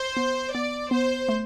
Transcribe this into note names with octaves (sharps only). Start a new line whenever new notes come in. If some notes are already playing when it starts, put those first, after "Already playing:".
Already playing: C5
B3
B3 D5
B3 C5
A3